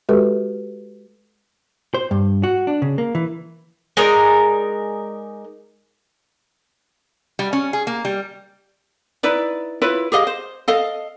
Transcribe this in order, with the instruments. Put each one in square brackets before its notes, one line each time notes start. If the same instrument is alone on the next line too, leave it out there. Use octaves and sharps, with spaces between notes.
[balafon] G#3 F#4 G4 A4 B4
[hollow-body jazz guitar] C5
G2
F#4
D4
C#3
A#3
E3
[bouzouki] G#3 D#4 A#4 D5
[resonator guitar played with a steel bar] G3
C#4
G#4
A#3
G3
[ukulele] D#4 E4 B4 D5
E4 F4 B4 C#5
G4 G#4 D#5 F5
C5
A4 D#5 F5